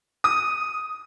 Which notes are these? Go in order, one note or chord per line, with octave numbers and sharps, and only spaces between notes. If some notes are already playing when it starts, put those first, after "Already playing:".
D#6